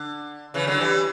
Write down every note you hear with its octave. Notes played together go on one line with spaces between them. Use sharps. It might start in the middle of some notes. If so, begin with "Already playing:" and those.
Already playing: D3
C#3 E3
D3 F#3
E3 G3